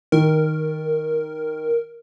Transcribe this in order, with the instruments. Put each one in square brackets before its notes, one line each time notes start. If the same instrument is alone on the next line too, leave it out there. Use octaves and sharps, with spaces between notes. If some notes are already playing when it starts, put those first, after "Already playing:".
[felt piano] D#3 [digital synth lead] A#4